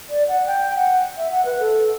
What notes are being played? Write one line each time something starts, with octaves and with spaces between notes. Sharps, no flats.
D5
F#5
G5
F#5
E5
F#5
B4
A4